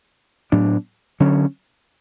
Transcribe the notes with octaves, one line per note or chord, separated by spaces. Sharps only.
A2 F#3 B3 D4
D3 F#3 C#4